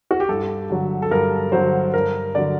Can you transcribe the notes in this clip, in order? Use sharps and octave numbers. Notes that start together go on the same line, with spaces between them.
F#4
G4
G2 A4
D3 F#3
A4
G2 A#4
D3 F#3 C5
G2 A#4
D3 F#3 D5